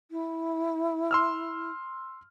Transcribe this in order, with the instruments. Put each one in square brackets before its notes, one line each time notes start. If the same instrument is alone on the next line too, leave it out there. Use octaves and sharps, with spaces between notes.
[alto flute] E4
[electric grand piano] C6 E6 F6